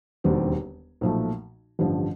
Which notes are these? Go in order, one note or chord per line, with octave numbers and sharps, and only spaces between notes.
E1 D#2 D3 G3 C4
B1 A#2 F3 A3
A1 G2 D3 F3